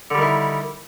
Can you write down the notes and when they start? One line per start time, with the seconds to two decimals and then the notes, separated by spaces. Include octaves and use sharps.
0.10 D3
0.14 G3
0.18 D#3
0.22 E4